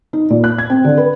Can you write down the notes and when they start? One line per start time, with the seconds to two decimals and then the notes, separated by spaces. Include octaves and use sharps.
0.13 D#4
0.30 A#2
0.44 F#6
0.58 G#6
0.70 C4
0.84 D3
0.98 B4